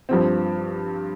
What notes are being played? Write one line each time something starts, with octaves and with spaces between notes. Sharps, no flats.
G2 F3 C4